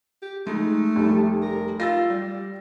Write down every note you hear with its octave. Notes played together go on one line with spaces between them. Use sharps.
G4
G#3 A3 D#4
F1 G3
A#4
F4 E6 A6 A#6
G3